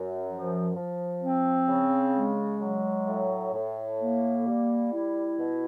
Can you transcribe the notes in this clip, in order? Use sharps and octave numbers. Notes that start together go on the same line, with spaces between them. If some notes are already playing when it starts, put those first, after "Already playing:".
Already playing: F#2
F3
F3
C4
C#3
G#3
F#3
A2
A2
A#3
G3
E4
B2